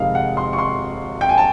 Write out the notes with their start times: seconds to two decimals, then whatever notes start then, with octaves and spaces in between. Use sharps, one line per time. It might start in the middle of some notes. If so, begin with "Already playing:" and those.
Already playing: F2 C3 D#3 G#3 F5
0.15 F#5
0.37 C6
0.53 C#6
0.58 C6
1.21 G5
1.29 G#5
1.38 A5